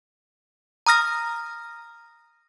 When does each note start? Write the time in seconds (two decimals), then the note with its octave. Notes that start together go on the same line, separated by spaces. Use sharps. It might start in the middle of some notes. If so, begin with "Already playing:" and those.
0.87 A#5 D#6 F6 A#6